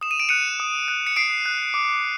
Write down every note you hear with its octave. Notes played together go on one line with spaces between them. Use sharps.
D#6 E7
D#7
D7
F#6 C#7 D#7
D#6
F#6
C#7
D#6 C7 D7
F#6
D6